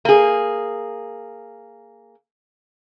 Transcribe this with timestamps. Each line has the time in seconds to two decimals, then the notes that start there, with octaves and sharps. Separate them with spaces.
0.05 A#3 G#4